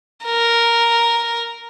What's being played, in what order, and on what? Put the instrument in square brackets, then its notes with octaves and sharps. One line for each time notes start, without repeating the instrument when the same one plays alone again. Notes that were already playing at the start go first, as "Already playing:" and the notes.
[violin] A#4